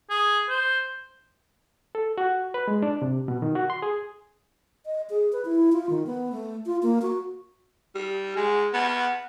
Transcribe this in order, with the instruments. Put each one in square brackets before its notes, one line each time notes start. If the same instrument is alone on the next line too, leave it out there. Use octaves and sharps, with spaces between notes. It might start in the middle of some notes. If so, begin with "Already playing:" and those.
[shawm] G#4
C5
[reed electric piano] A4
F#4
B4
G#3
D4
C3
B2
D#3
F#4
C6
G#4
[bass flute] D#5
G#4
B4
E4
F4
D#3
B3
A3
F4
A#3
F#4
[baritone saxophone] G3
G#3
B3